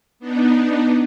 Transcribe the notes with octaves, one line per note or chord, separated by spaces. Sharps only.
B3 D4 D#4